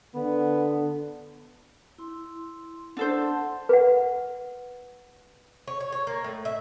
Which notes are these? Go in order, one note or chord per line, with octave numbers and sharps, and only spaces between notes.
D3 B3
E4 C6
D4 A4 C5 F#5 A5 C6
B4 F#5
C#5
C#5
C#5
A#3
A2
E5